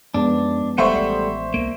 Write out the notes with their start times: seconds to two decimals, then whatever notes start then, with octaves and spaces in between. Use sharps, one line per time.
0.14 F#2 F3 G#3 B3 D4
0.78 D#1 G3 A3 C5 E5 F#5 C#6
0.95 A1 D5
1.54 C2 A#3